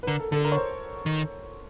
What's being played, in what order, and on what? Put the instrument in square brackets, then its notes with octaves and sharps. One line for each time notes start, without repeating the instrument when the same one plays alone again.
[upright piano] B4
[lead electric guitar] D3 [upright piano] A#4
[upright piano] A4
[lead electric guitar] D3 [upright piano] A4
[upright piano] A#4
C#5
C5
[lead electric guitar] D#3